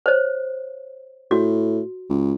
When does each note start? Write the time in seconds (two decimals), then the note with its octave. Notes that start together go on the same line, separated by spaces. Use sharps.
0.06 C5 C#5
1.31 A2 F#4
2.10 C#2